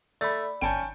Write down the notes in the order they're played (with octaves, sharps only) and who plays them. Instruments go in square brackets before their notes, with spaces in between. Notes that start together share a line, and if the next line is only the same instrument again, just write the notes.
[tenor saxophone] A3 [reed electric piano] D5 B5 [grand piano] A6
[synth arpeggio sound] G1 D7 [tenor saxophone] C#4 [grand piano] G5 A5 G6